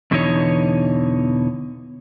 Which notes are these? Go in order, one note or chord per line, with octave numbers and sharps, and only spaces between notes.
E2 B2 D3 E3 D#4 C#5